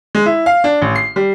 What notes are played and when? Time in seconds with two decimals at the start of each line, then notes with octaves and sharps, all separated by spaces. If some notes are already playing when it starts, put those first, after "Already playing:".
0.15 G#3
0.26 E4
0.46 F5
0.64 D4
0.82 A1
0.96 C7
1.16 G3